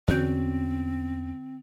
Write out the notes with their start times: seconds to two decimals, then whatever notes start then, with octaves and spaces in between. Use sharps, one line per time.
0.08 E2 D3 C4 C#4 F#4 G6